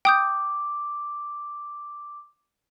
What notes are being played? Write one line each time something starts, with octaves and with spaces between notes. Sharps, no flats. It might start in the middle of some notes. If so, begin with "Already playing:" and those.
G5 D6 D#6 G6